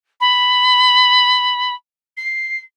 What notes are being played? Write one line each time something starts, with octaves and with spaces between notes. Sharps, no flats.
B5
C7